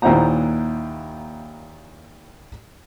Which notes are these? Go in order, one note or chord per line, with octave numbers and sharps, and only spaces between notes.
D#2 A#2 E4 C5 F#5 A#5